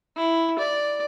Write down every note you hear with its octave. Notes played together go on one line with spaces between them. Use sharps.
E4
D5